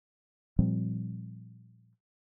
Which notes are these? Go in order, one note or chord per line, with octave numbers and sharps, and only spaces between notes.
A#2 F3 G3 C4